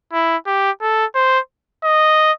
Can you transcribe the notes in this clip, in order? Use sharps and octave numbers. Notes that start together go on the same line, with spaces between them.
E4
G4
A4
C5
D#5